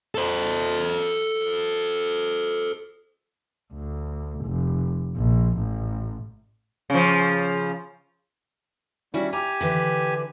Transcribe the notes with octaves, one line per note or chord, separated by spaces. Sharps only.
A4 C5
D2
F1
A#1
A1
C#3 F3
G3 C#4 E4 F#4 D5
G4 G#5 A#5
D3 E3 B4